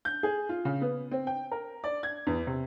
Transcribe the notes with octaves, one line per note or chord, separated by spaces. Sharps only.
G6
G#4
F4
C#3
B3
C4
G5
A#4
D5
G#6
E2
C3